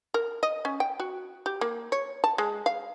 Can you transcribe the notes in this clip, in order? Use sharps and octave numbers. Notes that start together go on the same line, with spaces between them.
A#4
D#5
C#4
G5
F#4
G4
A#3
C#5
A5
G#3
F5